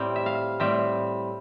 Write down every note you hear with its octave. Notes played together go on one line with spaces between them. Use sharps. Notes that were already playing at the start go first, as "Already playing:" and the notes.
Already playing: A2 G3 C4
E5
F5
A2 G3 C4 E5